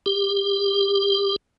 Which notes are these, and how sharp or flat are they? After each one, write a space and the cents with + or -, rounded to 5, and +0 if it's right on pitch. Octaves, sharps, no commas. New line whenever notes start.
G4 +25